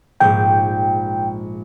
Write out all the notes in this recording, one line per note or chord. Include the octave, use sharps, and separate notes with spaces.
A#1 G#2 G5